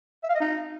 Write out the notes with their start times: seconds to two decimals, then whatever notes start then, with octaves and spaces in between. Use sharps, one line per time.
0.23 E5
0.29 F5
0.35 D#5
0.40 D#4